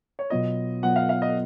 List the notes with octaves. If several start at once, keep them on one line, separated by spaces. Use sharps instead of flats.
C#5
B2 F#3 B3 F4 D#5
B2 F#3 B3 F4 F#5
F5
F5
D#5